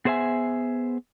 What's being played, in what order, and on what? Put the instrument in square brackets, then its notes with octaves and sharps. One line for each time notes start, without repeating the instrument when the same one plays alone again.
[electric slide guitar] B3 G#4 C5 D#5 E5 G#5